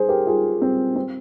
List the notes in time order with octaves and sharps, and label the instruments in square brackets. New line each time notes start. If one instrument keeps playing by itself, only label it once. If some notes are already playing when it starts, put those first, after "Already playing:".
Already playing: [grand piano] G#4 C5
G4 A#4
F4 G#4
C4
C4